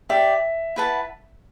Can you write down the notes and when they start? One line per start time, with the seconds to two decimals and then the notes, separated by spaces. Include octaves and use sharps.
0.09 G4 D5 E5 G5
0.76 E4 B4 F#5 A5